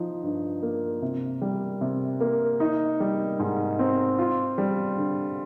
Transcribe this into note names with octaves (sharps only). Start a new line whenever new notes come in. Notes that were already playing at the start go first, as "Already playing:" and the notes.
Already playing: F3 D#4
G2
A#3
C3
G3
C3
A#3
D#4
G3
G#2
C4
F4
G3
D3